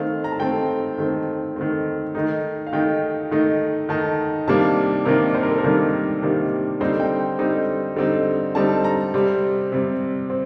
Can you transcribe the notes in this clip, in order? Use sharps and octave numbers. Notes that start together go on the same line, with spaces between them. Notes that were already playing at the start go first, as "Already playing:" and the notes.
Already playing: D#3 A3 C4 F5
A#5
A5
D#3 A3 C4 G5
D#3 A3 C4
D#3 A3 C4
D#3 A3 D#4
F5
D#3 A3 D#4 G5
D#3 A3 D#4
D#3 A3 D#4 A5
C3 D#3 G3 A#3 D4 A5
C3 D#3 G3 A#3 D4 A#4
C5
A#4
A4
A#4
C3 D#3 G3 A#3 D4
C3 D#3 G3 A#3 D4
D3 G3 C4 D#4 C5
G5
G5
D3 G3 C4 D#4
D3 G3 C4 D#4
D3 G3 C4 D#4 A5
A#5
C3 G3 C4
C3 G3 C4
C4